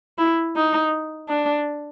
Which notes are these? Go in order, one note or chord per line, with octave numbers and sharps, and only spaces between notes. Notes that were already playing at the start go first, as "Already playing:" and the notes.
E4
D#4
D4